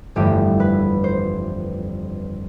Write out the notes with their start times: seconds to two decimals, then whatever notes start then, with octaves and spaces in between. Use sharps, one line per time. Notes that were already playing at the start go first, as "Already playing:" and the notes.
0.16 G1 F2 E3 A3 G4
0.60 B4
1.04 C5